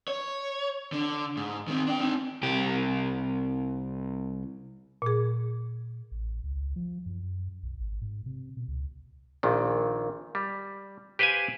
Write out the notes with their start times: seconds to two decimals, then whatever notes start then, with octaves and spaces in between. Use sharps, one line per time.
0.08 C#5
0.92 D3
1.37 G#2
1.68 D#3 C4
1.87 D4 G5
2.01 C4 D#4
2.43 C2 G4
5.02 A#2 G#4
6.11 A1
6.43 C#2
6.76 F3
7.06 F#2
7.63 B1
7.80 G#1
8.01 G#2
8.26 C3
8.57 B2
8.68 C#2
9.43 A#1 A#2 D#3
10.35 G3
11.19 G4 B4 C5 F5 G5 G#5